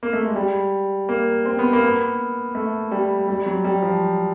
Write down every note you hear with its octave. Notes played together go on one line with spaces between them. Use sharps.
A#3
A3
G#3
G3
A#3
C4
B3
A#3
B3
A3
G3
G3
F#3
G3
F3